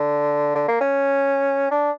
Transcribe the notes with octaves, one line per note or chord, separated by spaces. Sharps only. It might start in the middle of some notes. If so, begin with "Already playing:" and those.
Already playing: D3
D3
A#3
C#4
D4